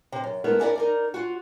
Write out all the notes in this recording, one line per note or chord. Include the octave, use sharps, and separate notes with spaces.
C3 C5
F#2
G#3 A3 B3 E4 A#4
A#3 C#4 D4 E4 A#4 D5
D#4 A#4 D5
F4 F#4